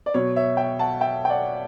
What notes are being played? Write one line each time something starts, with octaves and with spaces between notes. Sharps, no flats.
D5
B2 F#3 C#5
C#5 E5
E5 G5
F#5 A5
E5 G5
G5
D5 F#5